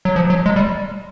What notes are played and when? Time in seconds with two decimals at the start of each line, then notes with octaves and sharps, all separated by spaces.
0.05 F#3
0.16 F3
0.30 F#3
0.46 G#3
0.56 G3